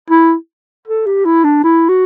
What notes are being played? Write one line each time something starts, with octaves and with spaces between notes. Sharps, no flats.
E4
A4
G4
E4
D4
E4
F#4